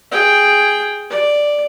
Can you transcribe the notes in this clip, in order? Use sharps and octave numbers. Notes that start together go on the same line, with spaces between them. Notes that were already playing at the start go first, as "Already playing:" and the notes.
G#4 G5
D5